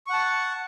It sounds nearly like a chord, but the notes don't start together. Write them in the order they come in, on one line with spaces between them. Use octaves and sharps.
C#6 F#5 A5